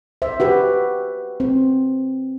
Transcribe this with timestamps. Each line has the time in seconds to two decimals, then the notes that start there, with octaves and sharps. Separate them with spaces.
0.22 C5 E5
0.40 F#4 G4 B4
1.40 C4